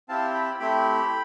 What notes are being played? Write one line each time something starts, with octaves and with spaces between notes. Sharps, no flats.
C4 E4 G4 F5 A5
G5 B5
A3 C4 E4 G4 G5 B5